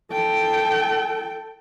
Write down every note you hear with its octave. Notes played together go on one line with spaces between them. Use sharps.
A4 G5